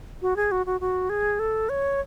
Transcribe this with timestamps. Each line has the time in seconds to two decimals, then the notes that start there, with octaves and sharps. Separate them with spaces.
0.22 F#4
0.36 G#4
0.52 F#4
0.66 F#4
0.81 F#4
1.10 G#4
1.39 A4
1.69 C#5